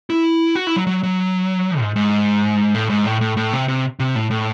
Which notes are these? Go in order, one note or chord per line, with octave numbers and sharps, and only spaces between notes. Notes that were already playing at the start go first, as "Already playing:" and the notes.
E4
F#4
E4
F#3
F#3
F#3
G#2
G#2
A2
G#2
A2
A2
A2
C3
C3
C3
A2
A2